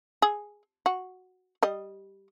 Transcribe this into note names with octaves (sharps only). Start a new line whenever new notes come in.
G#4
F#4
G3 D#5